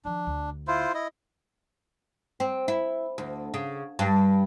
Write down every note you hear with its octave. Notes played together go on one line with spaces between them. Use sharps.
D#3 F3 D4
D2
E4 F4 C5
E4 D#5
C4
E4
D2
C#3
G2